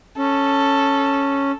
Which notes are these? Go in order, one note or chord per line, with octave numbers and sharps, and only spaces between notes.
C#4 A4